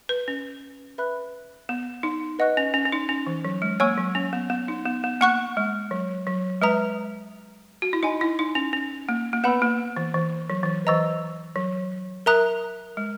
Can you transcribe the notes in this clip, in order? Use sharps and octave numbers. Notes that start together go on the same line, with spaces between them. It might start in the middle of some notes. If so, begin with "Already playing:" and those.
B4
C#4
B4 E5 B5 F#6
B3
D#4
B4 D#5 F#5 C#6 F#6
C#4
C#4
C#4
D#4
C#4
E3
F#3
G#3
A#3 C#5 G#5 C#6 E6
F#3
C#4
B3
B3
D#4
B3
B3
A#3 F#5 C#6 F#6
G#3
F#3
F#3
G#3 B4 E5 A#5 D#6
F#4
E4
D#4 D#5 G#5 B5
E4
D#4
C#4
C#4
A#3
A#3
B3 B4 F#5 B5 E6
A#3
E3
E3
F#3
E3
E3 B4 D#5 A#5 E6
F#3
A#4 E5 A#5 D#6 F#6
G#3